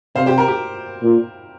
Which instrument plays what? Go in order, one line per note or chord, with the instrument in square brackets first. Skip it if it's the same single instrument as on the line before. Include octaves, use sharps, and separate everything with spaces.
[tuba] C3 [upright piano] C5 F5
[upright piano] G4 C5
A#4
G4
[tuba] A#2